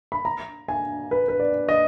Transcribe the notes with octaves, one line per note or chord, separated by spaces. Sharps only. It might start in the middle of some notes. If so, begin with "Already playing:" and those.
B5
A#5
G#5
B4
B4
D5
D#5